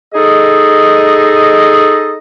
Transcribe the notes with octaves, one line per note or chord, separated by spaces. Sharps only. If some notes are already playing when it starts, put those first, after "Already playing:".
D#4 G#4 A4 D#5